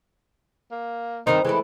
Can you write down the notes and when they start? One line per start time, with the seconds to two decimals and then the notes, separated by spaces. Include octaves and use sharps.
0.71 A#3
1.27 G2 D#3 C4 D#4
1.45 E3 G#3 A3 E4